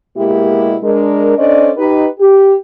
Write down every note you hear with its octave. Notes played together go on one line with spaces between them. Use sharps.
B2 G#3 A#3 E4 G4
G#3 D4 A#4
C#4 D4 A4 C5 D5 D#5
D#4 G4 B4
G4